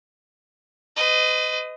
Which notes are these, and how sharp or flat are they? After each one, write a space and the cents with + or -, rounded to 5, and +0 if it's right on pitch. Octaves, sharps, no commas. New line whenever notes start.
B4 +45 D#5 +0